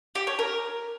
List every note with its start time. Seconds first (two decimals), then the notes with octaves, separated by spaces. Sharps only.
0.15 G4
0.27 C#5
0.39 A#4